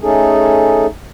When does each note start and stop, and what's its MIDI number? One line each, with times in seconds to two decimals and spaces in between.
0.01 0.86 57
0.01 0.86 61
0.01 0.86 63
0.01 0.86 68
0.01 0.86 69